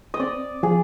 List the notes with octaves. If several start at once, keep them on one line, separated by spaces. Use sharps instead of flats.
D#5
C4 D5
F3 G#4